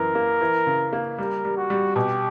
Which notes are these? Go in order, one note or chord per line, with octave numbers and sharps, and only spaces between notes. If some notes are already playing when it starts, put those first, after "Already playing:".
Already playing: F#2 E3 A#4
A#3
E3
C#3
A#3
G3 A#4
G3
F#4
G3
B2 G4